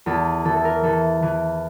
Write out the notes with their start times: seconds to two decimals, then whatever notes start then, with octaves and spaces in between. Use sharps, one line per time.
0.06 E2 A4
0.45 E3 A4
0.57 A4
0.65 A#4
0.84 E3 A4
1.22 E3